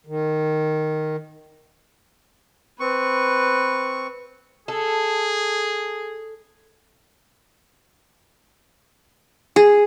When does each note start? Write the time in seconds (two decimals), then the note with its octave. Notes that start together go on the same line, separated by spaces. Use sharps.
0.06 D#3
2.80 C4 B4 C#6
4.68 G#4 A4
9.56 G#4